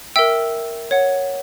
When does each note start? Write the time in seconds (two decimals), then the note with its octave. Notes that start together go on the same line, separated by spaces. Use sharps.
0.16 A#4 E5 G5 E6
0.91 C#5 F#5